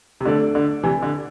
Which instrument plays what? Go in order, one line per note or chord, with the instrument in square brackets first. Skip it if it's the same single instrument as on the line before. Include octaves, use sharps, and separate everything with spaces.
[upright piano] C3
[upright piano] D3 [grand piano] A3 D4 A4 D5
[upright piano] D3
C3 E3
D3